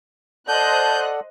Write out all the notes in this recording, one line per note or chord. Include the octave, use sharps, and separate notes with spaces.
A4 C5 D5 D#5 F#5 A5 F#6 G6